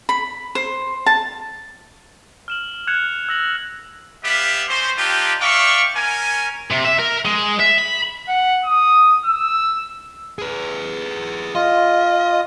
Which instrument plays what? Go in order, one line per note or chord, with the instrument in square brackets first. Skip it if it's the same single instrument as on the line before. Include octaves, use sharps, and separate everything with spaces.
[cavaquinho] B5
C5
A5
[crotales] F6 E7 F#7
F#6 G#6 C#7 E7 F7
E6 A#6 F#7
[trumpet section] G3 B3 G4 E5 F5
C4 C#4 C5
D4 D#4 F4 G4
D5 E5 F5 G5 C#6
C#4 A#4 G#5
[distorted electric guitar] C3
E5
A#4
G#3
E5
B5
[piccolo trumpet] F#5
D#6
E6
[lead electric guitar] G#4 B4
[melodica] F4 [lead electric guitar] D#5